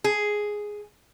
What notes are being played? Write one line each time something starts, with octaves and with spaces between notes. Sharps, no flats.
G#4